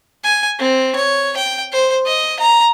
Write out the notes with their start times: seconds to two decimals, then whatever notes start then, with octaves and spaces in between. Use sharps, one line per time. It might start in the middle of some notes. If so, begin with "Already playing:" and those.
0.24 G#5
0.59 C4
0.96 C#5
1.37 G5
1.72 C5
2.06 D#5
2.40 A#5